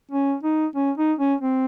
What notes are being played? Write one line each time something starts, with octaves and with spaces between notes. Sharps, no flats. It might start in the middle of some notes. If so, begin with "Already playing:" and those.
C#4
D#4
C#4
D#4
C#4
C4